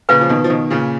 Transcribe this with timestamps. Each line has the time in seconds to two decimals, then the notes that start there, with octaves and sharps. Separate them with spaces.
0.09 A#2 C#3 B4 F5 B5
0.21 F3
0.29 B2 D#3
0.44 F3
0.50 B2 D#3
0.70 A#2 C#3